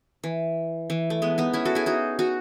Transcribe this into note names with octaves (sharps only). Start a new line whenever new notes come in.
E3
E3
A3
G#3 B3
B3 D#4
C#4 E4
F#4 A4
E4 G#4
D#4 F#4
D#4 F#4